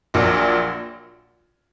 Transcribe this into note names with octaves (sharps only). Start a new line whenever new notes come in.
A#1 A#2 F#3